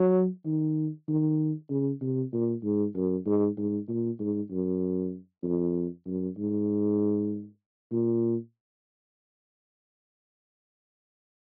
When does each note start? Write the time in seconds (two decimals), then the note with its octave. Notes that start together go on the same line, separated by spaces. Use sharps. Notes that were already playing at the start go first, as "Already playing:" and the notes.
Already playing: F#3
0.45 D#3
1.08 D#3
1.70 C#3
2.01 C3
2.32 A#2
2.63 G#2
2.95 F#2
3.25 G#2
3.57 G#2
3.88 A#2
4.19 G#2
4.51 F#2
5.43 F2
6.06 F#2
6.37 G#2
7.92 A#2